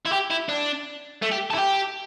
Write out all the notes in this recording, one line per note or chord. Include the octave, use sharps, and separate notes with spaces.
E4
G4
E4
D4
A3
G4
A4
E4
G4